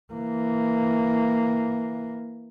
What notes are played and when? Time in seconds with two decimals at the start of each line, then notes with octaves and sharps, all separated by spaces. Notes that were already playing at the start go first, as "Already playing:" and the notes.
0.13 E3 A#3